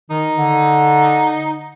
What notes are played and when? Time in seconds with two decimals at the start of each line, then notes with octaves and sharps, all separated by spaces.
0.10 D#3 D#4
0.37 D3